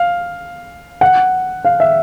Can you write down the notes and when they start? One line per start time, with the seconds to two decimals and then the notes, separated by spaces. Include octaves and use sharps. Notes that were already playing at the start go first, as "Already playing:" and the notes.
Already playing: F5
1.01 F#5
1.65 F5
1.80 E5